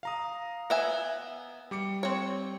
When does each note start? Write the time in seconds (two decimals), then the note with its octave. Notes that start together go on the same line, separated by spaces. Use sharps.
0.03 F5 A#5 D#6
0.70 B3 E5 G#5
1.71 G3 D6 C#7
2.03 C4 C#5